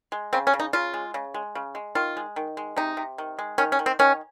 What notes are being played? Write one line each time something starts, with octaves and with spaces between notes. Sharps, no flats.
G#3
C#3 C4
C#4
C#3
D#4
C#3 F4
G#3
C#3
G#3
C#3
G#3
D#3 F4
G#3
D#3
G#3
C3 D#4
C3
D#3
G#3
D#3 C#4
C#4
D#3
C4
D#3 C#4